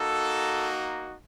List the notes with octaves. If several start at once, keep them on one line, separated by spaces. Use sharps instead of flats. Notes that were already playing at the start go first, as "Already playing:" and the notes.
Already playing: A#3 D#4 F#4 A4